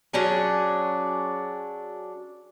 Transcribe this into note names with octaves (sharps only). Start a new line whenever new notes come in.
F#3 C#4 D4 G#4